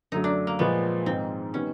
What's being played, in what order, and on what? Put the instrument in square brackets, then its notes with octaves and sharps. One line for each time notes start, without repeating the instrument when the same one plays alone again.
[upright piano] F#2 D3 F#3 A3 [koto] D#4
[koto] D4
A#3
[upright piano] A#2 F3 G#3 [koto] B3
[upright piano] G#2 D#3 G#3 [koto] C4
[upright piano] D#3 G3 B3 [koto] C#4